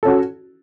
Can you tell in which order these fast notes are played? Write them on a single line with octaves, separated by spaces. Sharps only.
A4 C#4 F#4